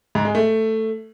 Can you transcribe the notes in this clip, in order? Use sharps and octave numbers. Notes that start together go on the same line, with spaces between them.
G#2
G#3
A3